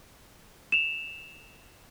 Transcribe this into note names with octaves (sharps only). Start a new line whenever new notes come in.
E7 F7